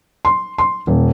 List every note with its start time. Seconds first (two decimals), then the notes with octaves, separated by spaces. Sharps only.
0.25 C6
0.58 C6
0.87 D#1